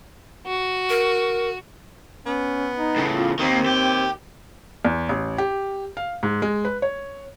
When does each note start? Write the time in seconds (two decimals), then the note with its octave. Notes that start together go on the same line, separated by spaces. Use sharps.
0.48 F#4
0.90 A#4
2.26 B3 C#4
2.76 D#4
2.96 A2 C#3
3.14 F4
3.39 D#2 D#3 A#3 C4
3.66 G4
4.85 E2
5.09 A1
5.38 G4
5.97 F5
6.23 G#2
6.42 G#3
6.65 B4
6.82 C#5